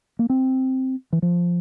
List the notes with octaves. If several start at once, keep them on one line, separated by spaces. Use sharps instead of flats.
A#3
C4
E3
F3